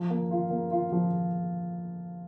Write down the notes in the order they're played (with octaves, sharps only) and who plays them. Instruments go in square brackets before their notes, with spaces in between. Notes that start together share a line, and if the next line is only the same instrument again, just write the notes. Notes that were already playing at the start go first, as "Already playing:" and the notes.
Already playing: [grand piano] F3
A#3
F4
A#3
F4
F3